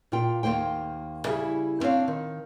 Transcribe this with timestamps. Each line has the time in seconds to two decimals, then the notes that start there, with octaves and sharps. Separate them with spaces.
0.12 A#2 F4 G5
0.43 D#2 G#2 A#3 C5 G5
1.26 C#3 G3 E4 G#4 E5
1.80 B3 C4 D4 C#5 F5
2.08 D#3